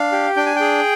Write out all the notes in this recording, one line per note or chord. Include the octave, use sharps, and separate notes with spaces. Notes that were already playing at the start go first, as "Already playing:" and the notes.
Already playing: D4 F5
G4
D4 G5
G#5
G#4 G5